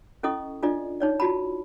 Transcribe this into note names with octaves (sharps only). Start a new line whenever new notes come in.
C#4 E4 A4 D#5 C#6 D#6
D4 F4 A4 D5 D#5
D#4 C#5 D5
F4 F#4 A5 B5